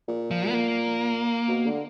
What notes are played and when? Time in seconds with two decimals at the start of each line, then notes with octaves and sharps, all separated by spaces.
0.08 A#2
0.31 F3
0.49 B3
0.54 A#3
1.48 B2
1.66 D3